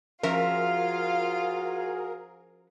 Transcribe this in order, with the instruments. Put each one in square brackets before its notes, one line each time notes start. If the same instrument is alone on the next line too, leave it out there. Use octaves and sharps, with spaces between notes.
[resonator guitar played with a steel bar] F3 C#4 E5 [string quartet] F4 F5 [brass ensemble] F#4 G#4 [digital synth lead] A#4